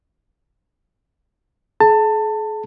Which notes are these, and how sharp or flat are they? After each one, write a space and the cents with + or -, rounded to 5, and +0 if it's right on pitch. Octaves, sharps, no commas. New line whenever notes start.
G#4 +45 A5 +25